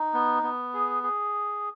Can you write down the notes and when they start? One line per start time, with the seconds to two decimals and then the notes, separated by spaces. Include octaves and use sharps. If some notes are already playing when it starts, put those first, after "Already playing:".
Already playing: D#4
0.14 B3
0.43 B3
0.74 G#4
1.03 G#4